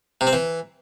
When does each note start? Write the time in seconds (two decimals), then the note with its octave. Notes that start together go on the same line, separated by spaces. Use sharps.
0.21 C3
0.27 C4
0.33 E3